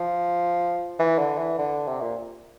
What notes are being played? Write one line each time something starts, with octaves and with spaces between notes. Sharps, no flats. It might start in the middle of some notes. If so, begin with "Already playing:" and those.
Already playing: F3
E3
D3
E3
D3
C3
A#2